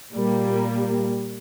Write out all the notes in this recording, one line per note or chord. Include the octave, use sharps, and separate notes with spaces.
A#2 G3 A#3